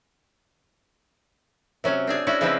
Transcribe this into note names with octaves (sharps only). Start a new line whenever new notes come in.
C3 F#3 C#4
C4 D4 G#4
C#4 D4 E4 F#4
C#3 F3 G#3 C4 E4 B4